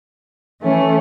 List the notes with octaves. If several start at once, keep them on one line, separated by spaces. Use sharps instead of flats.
E3 A3 C#4